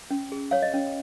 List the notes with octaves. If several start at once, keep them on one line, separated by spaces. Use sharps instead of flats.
C#4
G#4
C#5 F5
D#5
C#4